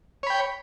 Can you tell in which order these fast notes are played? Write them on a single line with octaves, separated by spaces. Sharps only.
C#5 B5 G5